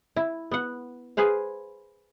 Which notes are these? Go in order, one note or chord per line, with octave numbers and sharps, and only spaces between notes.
E4
B3 F#5
G#4 B4 C5 F5